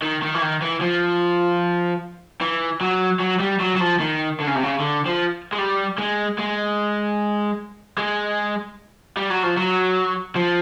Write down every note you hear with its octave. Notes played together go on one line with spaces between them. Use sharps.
D#3
D#3
E3
D#3
E3
F3
E3
F#3
F#3
G3
F#3
F#3
F3
D#3
D3
C#3
C3
C#3
D3
F3
G#3
G3
G#3
G#3
G#3
G3
F#3
F3
F#3
F3